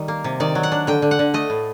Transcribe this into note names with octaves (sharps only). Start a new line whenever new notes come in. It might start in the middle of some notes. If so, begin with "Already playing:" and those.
Already playing: D#3 G3
A#3
C3
D#3 D5
F#3
F#5
D4
D3 G5
D3
F#5
D3
A3 D#5
A2